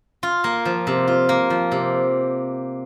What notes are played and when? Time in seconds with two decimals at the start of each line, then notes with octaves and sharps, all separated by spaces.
0.23 F4
0.44 A#3
0.65 F3
0.87 C3
1.08 F4
1.29 A#3
1.50 F3
1.72 C3